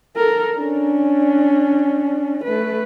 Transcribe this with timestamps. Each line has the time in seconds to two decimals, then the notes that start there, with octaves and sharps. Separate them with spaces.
0.17 A4 A#4
0.58 C#4 D4
2.45 A3 B4